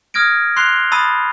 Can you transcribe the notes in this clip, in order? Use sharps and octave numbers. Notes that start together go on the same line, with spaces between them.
D#6 F6 G#6 A#6 D7
C6 F#6 C7 F7 G7
A5 B5 D#6 E6 A6 D#7